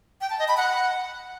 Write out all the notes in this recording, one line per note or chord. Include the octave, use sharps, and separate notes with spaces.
G5
A5
D#5
B5
F#5